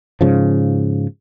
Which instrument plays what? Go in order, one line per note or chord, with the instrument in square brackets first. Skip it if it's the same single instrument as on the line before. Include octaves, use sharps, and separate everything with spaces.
[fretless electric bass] G#2 C#3 F3